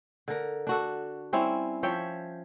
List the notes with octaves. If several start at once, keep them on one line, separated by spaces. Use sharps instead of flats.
D3 A#4
D4 F#4 A4
G3 C4 C#4 E4
F3 C#5 E5 G5